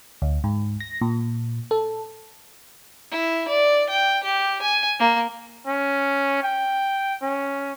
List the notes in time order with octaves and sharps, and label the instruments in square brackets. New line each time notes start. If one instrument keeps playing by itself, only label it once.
[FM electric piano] D2
G#2
A#6
A#2
A4
[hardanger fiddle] E4
D5
G5
G4
G#5
A#3
[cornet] C#4
G5
C#4